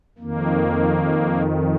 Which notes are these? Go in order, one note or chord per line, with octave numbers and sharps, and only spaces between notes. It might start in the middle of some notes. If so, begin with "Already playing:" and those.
F2 D#3 A#3